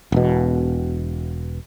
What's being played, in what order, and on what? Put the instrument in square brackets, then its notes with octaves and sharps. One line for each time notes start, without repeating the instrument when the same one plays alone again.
[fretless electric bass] E1 B2